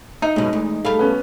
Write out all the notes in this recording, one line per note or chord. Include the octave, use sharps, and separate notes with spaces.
D#4 E5
F#2 B2 G#3
E2 A3 G#4
G3 A3 G#4 A4 F5 B5
B3 C#4